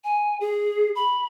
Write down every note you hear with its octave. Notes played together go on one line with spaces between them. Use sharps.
G#5
G#4
B5